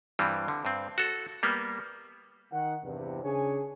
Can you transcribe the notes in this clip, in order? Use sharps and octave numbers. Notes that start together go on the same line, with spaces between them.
G2 E3 G3 C4
D3
G2 C4
F#4 A4
G3 A#3 B3
D#3 F#5
E2 G2 C3
C#3 D4 G#4 C#5 G#5